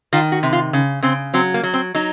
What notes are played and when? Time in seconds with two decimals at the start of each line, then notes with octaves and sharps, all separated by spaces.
0.13 D#3 F4
0.32 F#4
0.43 C3
0.53 F4
0.73 C#3
1.02 C#3 C4
1.34 F#3 C4
1.54 A#3
1.63 F#3
1.74 C4
1.95 F#3 D#4